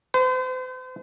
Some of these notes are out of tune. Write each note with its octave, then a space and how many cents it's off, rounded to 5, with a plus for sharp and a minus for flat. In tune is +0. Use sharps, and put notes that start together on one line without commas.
C5 -40